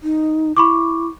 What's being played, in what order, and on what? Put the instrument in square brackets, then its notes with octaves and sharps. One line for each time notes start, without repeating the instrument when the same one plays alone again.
[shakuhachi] D#4
[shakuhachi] E4 [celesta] B5 C#6 D6